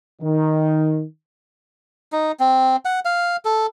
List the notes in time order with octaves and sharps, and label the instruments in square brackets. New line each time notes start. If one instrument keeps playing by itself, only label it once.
[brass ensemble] D#3
[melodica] D#4
C4
F#5
F5
A4